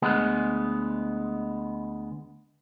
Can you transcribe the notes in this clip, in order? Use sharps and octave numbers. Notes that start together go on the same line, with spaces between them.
D2 G#3 B3